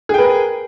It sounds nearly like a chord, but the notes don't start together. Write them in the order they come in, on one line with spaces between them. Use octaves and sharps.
G#4 G5 B4 A#4